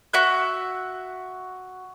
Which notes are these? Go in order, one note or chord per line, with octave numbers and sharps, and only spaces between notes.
F#4 E5 F#6